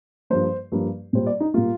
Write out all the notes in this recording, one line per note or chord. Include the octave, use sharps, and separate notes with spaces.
G2 F3 A#3 C5
G2 F3 A#3
A#2 G3 A#3 C5
D5
D#4
A#2 G3 A#3 F4